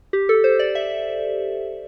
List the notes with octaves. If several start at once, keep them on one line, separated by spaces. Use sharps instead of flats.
G4
A4
C5
D5
E5